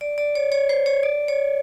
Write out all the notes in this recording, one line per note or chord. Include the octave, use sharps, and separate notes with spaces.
D5
D5
C#5
C#5
C5
C#5
D5
C#5